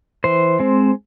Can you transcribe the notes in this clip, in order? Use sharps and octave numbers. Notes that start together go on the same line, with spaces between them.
E3 C5
G#3 C4